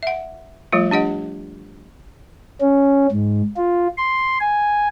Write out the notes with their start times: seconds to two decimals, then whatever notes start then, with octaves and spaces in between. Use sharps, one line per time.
0.03 E5 F#5
0.72 F3 G3 A3 F4
0.91 D4 G4 D#5 F#5
2.61 C#4
3.12 G#2
3.56 F4
3.98 C6
4.41 G#5